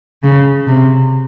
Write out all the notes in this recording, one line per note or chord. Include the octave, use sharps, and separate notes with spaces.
C#3
C3